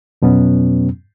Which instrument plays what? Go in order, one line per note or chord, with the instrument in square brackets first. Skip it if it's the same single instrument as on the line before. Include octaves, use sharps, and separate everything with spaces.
[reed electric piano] F2 B2 F#3 B3 C#4